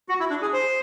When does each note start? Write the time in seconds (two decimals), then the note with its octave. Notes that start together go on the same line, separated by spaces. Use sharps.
0.09 F#4
0.20 E4
0.30 D4
0.42 G#4
0.53 C5